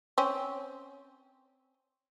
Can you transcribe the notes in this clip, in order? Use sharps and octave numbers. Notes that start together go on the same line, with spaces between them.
C4 C#4